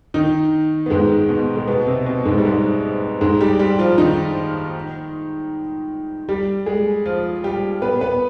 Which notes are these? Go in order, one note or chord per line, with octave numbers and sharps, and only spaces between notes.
D#3 D#4
B3
G#2 G#3
B2 B3
G#3
B2 B3
C3 C4
B2 B3
G#2 G#3
G3
G#2 G#3
G#2 G#3
G3 G4
G3 G4
F3 F4
D#3 D#4
G3 G4
G#3 G#4
F3 F4
G3 G4
B3 B4
B3 B4